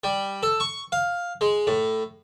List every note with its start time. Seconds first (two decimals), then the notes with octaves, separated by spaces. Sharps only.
0.04 G3
0.43 A4
0.60 C#6
0.92 F5
1.41 G#3
1.67 A2